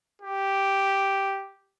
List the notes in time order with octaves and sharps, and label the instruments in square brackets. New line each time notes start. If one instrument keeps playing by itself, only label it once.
[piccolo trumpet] G4